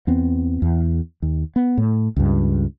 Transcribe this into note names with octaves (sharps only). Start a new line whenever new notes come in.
E2 B3 C4
E2
D#2
B3
A2
C#2 G2